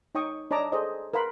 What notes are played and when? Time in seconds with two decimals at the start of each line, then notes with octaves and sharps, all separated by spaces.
0.15 D#4 C#5 G5 C#6 D#6
0.51 D4 C#5 D#5 A5 A#5 D6
0.72 G#4 A4 C5 D#5
1.14 A#4 B4 F5 B5 C6